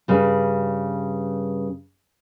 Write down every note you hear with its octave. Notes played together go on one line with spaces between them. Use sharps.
G2 C#3 G3